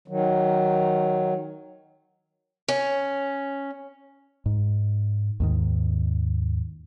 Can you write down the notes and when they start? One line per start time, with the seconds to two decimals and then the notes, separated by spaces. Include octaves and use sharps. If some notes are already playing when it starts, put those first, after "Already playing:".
0.08 D#3 F#3
2.68 C#4
4.46 G#2
5.40 D#2 G#2 D#3